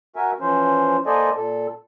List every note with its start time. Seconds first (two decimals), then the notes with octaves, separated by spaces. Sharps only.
0.16 F#4 A#4 E5 G#5
0.41 E3 F3 C#4 C5
1.06 A#3 A4 C5 D5 D#5 G#5
1.36 A#2 A4